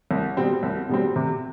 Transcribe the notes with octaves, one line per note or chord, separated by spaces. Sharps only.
C2
B2 G3 C4
C2
B2 G3 C4
C3